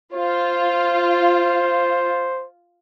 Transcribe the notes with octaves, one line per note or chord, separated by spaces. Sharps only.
F4 C5